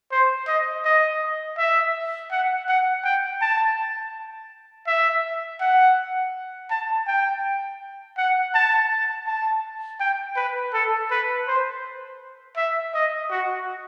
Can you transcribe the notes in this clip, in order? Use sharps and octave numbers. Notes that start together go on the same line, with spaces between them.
C5
D#5
D#5
E5
F#5
F#5
G5
A5
E5
F#5
A5
G5
F#5
A5
A5
G5
B4
A4
B4
C5
E5
D#5
F#4